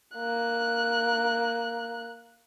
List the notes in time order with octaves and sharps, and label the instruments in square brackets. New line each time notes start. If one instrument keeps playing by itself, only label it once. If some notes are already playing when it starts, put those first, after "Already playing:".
[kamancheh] A#3 F#6